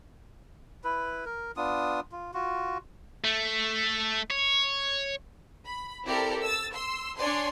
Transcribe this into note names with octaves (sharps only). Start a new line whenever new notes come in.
E4 B4
A#4
B3 D4 F4 D#6
F4
F4 F#4
A3
C#5
B5
C4 E4 G4 A4 A#4 D5
E6 A6
C6 E6
D4 C#5 D5 G#5 C6